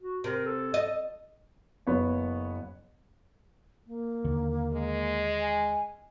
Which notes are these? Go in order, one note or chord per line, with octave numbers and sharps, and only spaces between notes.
F#4
C3 A#4
A4
D#5
F#1 B3 C#5
A#3
D#2 D3 D#3
G#3
G#5